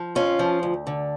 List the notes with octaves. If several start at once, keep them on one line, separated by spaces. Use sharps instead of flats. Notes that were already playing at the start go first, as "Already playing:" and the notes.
Already playing: F3
F2 C#4 F4
F3
D2
D3